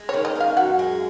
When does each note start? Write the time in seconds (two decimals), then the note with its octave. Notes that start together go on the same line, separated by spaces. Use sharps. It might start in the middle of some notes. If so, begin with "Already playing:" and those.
Already playing: G#3
0.09 D#3 C#5
0.25 D#5
0.35 C#4
0.40 F5
0.57 F#2 F#5
0.79 G#3